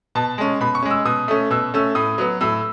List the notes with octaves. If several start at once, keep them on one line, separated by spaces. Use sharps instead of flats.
B2 A5
G#3 C#4
B2 B5
C#6
G#3 C#4
E6
B2 D#6
A3 C#4
B2 E6
A3 C#4 E6
A2 D#6
F#3 B3
A2 E6